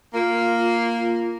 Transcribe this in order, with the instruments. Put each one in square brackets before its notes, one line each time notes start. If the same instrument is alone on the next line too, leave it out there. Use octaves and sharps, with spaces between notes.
[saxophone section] A#3 [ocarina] F4